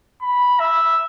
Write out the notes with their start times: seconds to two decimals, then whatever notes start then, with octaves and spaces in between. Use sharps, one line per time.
0.22 B5
0.60 E5